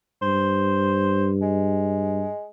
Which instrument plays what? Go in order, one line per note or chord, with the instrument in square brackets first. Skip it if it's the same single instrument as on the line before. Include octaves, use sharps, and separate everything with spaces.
[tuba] G2 [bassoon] C5
[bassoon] G#3